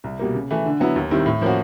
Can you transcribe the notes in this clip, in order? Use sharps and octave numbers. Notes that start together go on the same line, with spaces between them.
C2
B2 G3 A#3
C#3
E3 A3
D3
F#3 B3 E4
D#2
D#3 G3 C4 E4
A2
F3 A#3 C#4 F#4